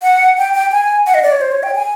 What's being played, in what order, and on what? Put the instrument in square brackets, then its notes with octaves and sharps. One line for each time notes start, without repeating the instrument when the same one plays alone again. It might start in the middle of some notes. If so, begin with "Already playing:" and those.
[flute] F#5
G5
G5
G#5
F#5
D#5
D5
C#5
C5
C#5
G5
G#5